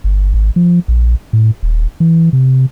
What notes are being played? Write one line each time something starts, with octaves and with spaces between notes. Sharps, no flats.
G1
G#1
F3
A#1
A2
D#1
E3
C3